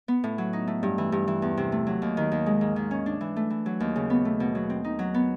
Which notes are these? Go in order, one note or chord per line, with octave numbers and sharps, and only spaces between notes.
B3
A2
F#3
D#4
A3
G2
E3
G2
E3
E2
C3
A3
F#3
D#2
D#3
D#2
G#3
G#2
D#3
C#4
D4
E3
A3
E3
F#3
D#2
C#3
B3
A3
B2
F#3
C4
D#4
F#3
B3